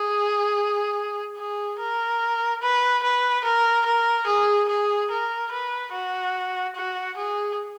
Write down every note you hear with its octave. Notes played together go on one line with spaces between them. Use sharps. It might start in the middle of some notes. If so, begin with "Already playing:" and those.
Already playing: G#4
G#4
A#4
B4
B4
A#4
A#4
G#4
G#4
A#4
B4
F#4
F#4
G#4